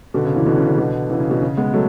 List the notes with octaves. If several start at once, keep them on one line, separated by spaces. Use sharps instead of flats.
B2 D3
C#3
C#3 E3
B2 D3
C#3
C#3
B2 D3
C#3 E3
C#3
B2
C#3
G#3 B3
F#3 A3